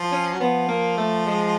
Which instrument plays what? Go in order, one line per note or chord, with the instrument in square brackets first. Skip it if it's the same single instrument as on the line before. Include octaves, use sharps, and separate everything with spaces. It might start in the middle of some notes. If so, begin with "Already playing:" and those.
Already playing: [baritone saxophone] F3
[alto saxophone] C#4
[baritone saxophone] F#3
[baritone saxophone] F3 [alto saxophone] B3
[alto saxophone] A#3
A3
G#3